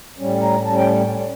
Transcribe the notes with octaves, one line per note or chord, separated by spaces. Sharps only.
A2 G3 C#4
A#5
A2 G3 C#4 A5
G5